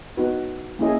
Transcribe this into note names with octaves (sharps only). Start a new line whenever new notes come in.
B3 D#4 F#4 B4
A#3 C#4 E4 G#4 D#5